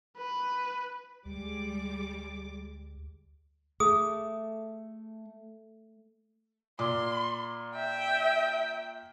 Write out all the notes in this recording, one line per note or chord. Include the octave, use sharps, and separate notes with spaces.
B4
D2 G3 G#3 D6
A3 G#4 D#6
A#2 C6 D6
E5 G5